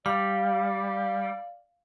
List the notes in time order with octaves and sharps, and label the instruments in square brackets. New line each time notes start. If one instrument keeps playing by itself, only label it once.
[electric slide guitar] G3 [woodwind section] D5 [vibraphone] F5